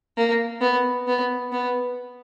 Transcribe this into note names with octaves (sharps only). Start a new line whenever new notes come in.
A#3
B3
B3
B3